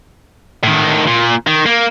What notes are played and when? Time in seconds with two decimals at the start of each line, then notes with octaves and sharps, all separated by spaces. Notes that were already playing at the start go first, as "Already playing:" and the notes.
0.64 A2 D#3
1.07 A#2
1.47 D#3
1.66 A#3